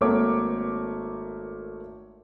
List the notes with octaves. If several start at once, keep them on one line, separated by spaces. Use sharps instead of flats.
G#1 A3 A#3 C#5 D6